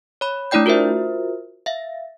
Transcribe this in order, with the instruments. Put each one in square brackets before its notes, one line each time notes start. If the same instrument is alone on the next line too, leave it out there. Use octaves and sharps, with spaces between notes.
[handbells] C#5 B5
A3 D4 E4 D5 G5 G6
F4 F#4 A#4 C5 E5
E5 F5